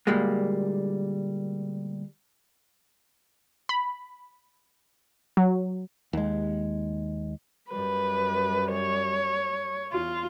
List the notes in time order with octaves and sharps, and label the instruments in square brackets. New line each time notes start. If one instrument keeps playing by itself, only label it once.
[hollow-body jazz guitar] D2 A#2 G3 G#3 A#3
[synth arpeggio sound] B5
F#3
[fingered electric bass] D#2 G#3
[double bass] F#2 G3 [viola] B4
[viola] C#5
[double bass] E2 [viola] F4